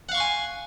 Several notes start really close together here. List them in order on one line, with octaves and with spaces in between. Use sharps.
F#5 F5 C#6 C6 G#5